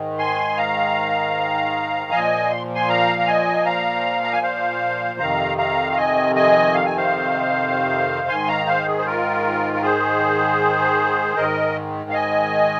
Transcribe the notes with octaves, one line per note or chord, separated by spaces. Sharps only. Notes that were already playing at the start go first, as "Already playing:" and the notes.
Already playing: G#2 D#3
G#5 C6
F5 A#5
A#2 F3 D#5 G#5
C6
G#5 C6
F5 A#5
A#5
D#5 G#5
F5 A#5
A#5
G#5
C5 F5
F2 C3 D#3 F5 A#5
F5 A#5
A#5
D#5 G#5
D#5 G#5
F5
G#5
C5 F5
G#2 D#3 G#5 C6
F5 A#5
C5 F5
G#4
C5
F4 A#4
A#4
G#4 C5
G#2 D#3 A#4 D#5
F5
D#5 G#5